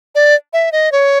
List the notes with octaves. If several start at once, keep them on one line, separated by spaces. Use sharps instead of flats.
D5
E5
D#5
C#5